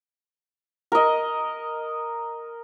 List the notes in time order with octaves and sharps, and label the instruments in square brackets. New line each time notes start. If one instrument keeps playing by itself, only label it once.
[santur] A#4 D#5